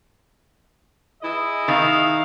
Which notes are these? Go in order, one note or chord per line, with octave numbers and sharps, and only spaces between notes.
E4 G#4 D#5
D#3 F5